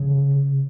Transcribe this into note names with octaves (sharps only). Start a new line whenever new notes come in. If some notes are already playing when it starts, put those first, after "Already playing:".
Already playing: C#3